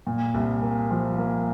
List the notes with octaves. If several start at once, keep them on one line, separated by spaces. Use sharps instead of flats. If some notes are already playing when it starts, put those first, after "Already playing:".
A#2
C2
A#3
F3
A#3